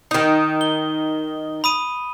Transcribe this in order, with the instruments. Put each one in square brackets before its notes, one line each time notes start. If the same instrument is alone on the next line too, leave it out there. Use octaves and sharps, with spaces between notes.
[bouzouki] D#3 D#4
[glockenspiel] G7
B5 D#6 D#7